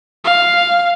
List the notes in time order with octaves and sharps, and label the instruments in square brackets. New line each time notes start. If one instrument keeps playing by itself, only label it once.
[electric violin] F5